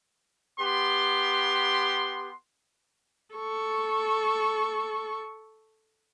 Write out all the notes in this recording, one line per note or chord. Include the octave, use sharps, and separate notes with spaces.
B3 G4 C6
A4 C#6